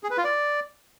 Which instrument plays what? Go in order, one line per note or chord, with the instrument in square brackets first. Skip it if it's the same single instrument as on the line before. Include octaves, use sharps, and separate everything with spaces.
[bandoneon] G#4
B4
F4
D5